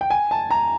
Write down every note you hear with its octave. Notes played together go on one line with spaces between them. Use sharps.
G5
G#5
A5
A#5